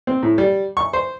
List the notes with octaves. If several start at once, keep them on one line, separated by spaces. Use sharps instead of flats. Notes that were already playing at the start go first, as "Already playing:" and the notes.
C4
A2
G3
C#6
C5